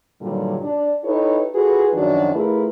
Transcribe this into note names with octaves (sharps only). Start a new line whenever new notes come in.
G2 A#2 D3 D#3 F#3 G3
D4
D#4 E4 G4 A4 B4 C#5
F4 F#4 G#4 A4 B4
F#2 D#3 F3 D4 F#4
A3 E4 F4 G#4 A#4 B4